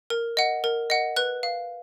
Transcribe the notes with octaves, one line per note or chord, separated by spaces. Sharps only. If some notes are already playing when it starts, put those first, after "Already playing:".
A#4
D#5 F#5
A#4
D#5 F#5
B4 F#6
F5